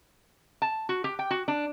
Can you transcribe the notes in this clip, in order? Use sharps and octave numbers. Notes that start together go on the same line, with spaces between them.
A5
F#4
G4
G5
F#4
D4